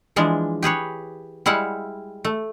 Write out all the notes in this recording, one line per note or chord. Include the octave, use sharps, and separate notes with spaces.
E3 F3 G#3 D4
G4 G#4 B4 C#5
G3 G#3 E4 F5 F#5
A3